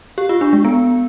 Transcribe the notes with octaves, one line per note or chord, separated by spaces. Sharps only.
G4
F4
D4
G#3
B3